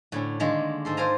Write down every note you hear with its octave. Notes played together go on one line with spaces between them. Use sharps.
A2 D3 C#4
D3 D#3 G#3 A#3
G#2 A4 C6
F4 C5 D5 F5 G#5 A#5